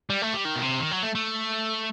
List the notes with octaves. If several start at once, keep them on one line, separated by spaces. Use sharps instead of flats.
G3
A3
G3
D#3
B2
C3
D#3
F#3
A3
A3